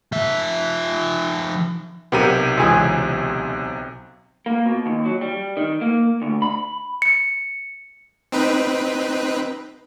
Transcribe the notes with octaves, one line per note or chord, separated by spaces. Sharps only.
F3 E5
B1 C3 B3 G4 A#4 D#7
C#2 E3 G#4
A#3
B2
D#2
F#3
G3
D#3
A#3
D2
B5
C#7
C4 D#4 B4